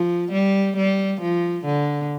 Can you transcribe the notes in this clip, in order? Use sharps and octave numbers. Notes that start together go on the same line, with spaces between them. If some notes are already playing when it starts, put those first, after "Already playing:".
Already playing: F3
G3
G3
F3
D3